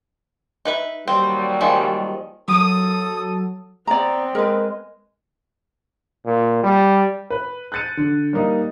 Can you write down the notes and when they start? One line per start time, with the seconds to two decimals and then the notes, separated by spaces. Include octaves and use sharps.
0.65 D#4 B4 E5
1.08 D#2 F#3 G3 C4
1.61 D#3 F3 G#3
2.48 F#3 A4 D#6
3.87 B3 C4 D5 A#5
4.35 G#3 A#4 B4
6.25 A#2
6.63 G3
7.30 B4
7.72 F#6 G6 A6 C#7 D#7
7.97 D3
8.33 G3 A#3 D#4 D#5